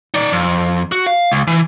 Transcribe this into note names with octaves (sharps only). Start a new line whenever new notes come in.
D#4 D5
F2
F#4
F5
C#2
E3